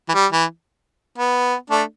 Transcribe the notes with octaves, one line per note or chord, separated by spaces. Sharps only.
E3
G3
E3
B3
A3 D4